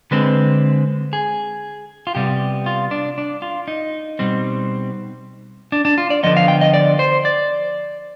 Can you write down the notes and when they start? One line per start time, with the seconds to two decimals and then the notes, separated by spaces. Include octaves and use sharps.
0.11 D3 G#3 C4 B4
1.13 G#4
2.07 F4
2.15 C3 G3 B3 G4
2.66 F4
2.91 D4
3.18 D4
3.42 F4
3.68 D#4
4.19 B2 G3 C4
5.72 D4
5.85 D4
5.98 F4
6.10 D5
6.23 D3 F3 B3 D#5
6.37 F5
6.48 G5
6.61 D#5
6.74 D5
6.99 C5
7.25 D5